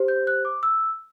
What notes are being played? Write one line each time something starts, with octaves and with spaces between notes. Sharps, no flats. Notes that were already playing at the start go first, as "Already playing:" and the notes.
Already playing: G4 C5
G6
F#6
D6
E6